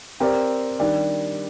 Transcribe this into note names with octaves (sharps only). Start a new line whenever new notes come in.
C4 G4 A#4 D5
D#3 G3 D4 G4 D5